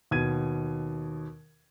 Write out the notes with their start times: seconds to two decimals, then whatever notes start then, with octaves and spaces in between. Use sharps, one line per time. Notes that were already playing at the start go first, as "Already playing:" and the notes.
0.11 D#2 B2 G#6 D#7